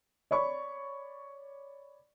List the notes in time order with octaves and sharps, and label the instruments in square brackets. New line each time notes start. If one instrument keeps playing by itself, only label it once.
[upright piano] C#5 D5 B5 C#6